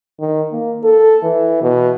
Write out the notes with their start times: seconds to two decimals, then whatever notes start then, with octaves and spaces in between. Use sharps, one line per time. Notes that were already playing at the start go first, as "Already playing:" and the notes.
0.20 D#3
0.52 A#3
0.83 A4
1.23 E3
1.62 B2